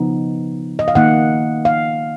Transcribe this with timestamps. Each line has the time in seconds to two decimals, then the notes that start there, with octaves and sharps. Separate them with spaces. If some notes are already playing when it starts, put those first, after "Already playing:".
Already playing: C#3 F3 B3 D#4
0.79 D#5
0.88 F5
0.95 D#3 A#3 D#4 F#5
1.65 F5